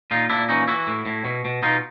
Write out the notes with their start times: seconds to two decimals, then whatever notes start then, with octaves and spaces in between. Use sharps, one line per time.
0.11 A#2 D#4 F4
0.30 A#2 D4 E4
0.49 E3 C#4 D#4
0.68 E3 E4 F#4
0.87 A2
1.06 A2
1.25 B2
1.45 B2
1.63 B2 D#4 F4